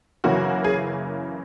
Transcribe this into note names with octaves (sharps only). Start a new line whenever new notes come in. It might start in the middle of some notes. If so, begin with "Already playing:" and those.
F#2 C#3 E3 A#3 C#4 F#4
G#4